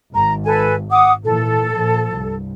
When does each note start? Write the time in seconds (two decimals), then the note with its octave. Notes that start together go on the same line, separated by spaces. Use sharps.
0.13 G#1 A#5
0.46 A4 B4 G#5
0.91 F#5 D6 D#6
1.24 A#2 E3 A4
1.73 A#2 F3
2.15 C2 G2